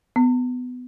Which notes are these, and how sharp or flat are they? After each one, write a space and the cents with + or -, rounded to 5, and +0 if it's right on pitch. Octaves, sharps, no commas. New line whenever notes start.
B3 +20